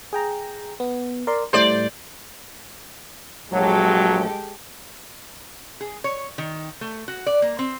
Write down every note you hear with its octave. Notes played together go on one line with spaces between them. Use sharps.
G#4 G5 A#5
B3
A#4 D5 C6
A2 G3 A3 C5 D5
A#1 F#3 G#3 G4 A4
G#4
C#5
D#3
A3
F#4
D5
A#3
C4